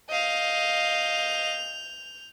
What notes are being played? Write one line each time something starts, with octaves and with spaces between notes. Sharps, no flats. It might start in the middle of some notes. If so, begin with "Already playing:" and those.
D#5 F5 G6 F7